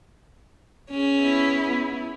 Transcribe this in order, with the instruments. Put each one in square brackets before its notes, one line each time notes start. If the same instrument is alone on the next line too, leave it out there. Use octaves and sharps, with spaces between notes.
[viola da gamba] C#4 G#4
[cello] B3 E4